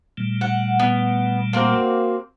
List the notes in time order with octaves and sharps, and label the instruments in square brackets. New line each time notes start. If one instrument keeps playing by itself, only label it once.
[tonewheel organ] A#2 G3 A3
[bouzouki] F#5
B3
A#3 C4 F#4